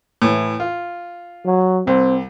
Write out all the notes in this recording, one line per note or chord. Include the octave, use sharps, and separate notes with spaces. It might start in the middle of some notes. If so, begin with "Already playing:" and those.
A2 E3
F4
F#3
C2 C4